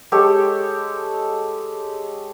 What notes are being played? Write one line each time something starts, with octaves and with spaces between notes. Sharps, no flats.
G#3 G4 A4 C#5